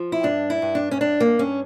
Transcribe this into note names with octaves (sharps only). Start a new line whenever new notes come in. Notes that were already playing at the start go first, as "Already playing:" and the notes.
Already playing: F3
E4
G2 D4
E4
G2
D4
C#4
G2 D4
A#3
G2 C#4